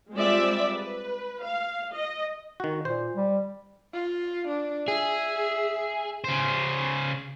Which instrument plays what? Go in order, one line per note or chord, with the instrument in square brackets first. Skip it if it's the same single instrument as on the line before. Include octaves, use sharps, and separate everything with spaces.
[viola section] G3 G#3 C4 F4 D5 E5
B4
F5
D#5
[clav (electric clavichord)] D#3 F#4
[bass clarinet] A#2 [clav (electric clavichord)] C5
[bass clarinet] G3
[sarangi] F4
D4
[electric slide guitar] G#4 [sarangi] E5
[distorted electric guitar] C#3 C5